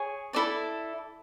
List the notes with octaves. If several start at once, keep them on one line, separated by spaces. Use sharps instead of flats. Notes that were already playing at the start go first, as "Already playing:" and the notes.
Already playing: G#4 C#5 G#5
E4 A4 D5 A5